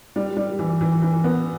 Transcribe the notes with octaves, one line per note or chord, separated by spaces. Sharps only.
G3
G3
E3
E3
E3
B3